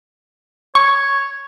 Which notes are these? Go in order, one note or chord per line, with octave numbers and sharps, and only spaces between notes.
C#5 C#6